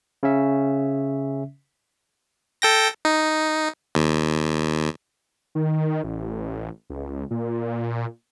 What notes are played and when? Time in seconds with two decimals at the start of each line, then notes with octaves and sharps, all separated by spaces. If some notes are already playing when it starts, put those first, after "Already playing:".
0.23 C#3 C#4 E5
2.62 A4 G5 A#6
3.05 D#4
3.95 D#2
5.55 D#3
6.04 A1
6.90 C#2
7.31 A#2